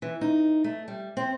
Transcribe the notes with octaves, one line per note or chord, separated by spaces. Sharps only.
E3
D#4
A3
G3
C4